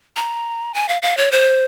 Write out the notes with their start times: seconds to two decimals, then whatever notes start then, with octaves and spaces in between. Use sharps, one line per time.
0.16 A#5
0.74 G#5
0.88 F5
1.02 F5
1.17 C#5
1.32 C5